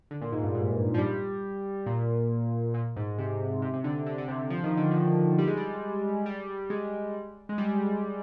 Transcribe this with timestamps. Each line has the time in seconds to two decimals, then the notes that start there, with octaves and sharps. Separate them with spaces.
0.11 D3
0.21 A#2
0.32 G#2
0.43 G2
0.55 G#2
0.94 F3
0.98 G3
1.86 A#2
2.74 A#2
2.96 G#2
3.18 C3
3.62 C3
3.73 C3
3.84 D3
4.06 D3
4.18 D3
4.28 C3
4.50 F3
4.64 D#3
4.77 D3
4.91 D#3
5.38 G3
5.48 G#3
5.57 G3
6.26 G3
6.70 G#3
7.49 G#3
7.58 G3